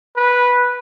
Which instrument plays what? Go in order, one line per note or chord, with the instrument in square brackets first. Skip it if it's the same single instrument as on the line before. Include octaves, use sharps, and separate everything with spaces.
[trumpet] B4